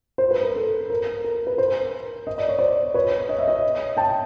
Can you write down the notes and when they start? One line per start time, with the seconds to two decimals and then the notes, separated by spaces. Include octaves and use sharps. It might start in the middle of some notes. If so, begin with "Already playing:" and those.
0.18 C5
0.31 B4
0.43 A#4
0.56 A4
0.90 A#4
1.24 A#4
1.47 B4
1.58 A#4 C5
2.27 D#5
2.38 D5
2.49 C#5
2.59 C5 D5
2.94 B4 C#5
3.29 D#5
3.39 E5
3.48 C#5 D#5
3.97 G5 A5